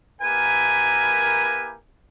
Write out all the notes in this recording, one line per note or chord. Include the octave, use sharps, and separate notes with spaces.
A#3 E4 G4 A#4 B4 G#5